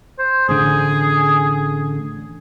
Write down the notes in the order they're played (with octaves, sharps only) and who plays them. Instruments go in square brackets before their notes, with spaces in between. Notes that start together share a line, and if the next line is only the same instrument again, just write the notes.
[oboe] C5
[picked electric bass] A1 D3 [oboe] G#4